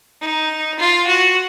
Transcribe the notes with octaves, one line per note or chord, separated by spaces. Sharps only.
D#4
F4
F#4